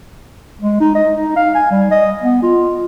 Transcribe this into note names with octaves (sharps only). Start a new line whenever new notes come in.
G#3
D#4
D#5
D#4
F5
G#5
G3
D#5
B3
F4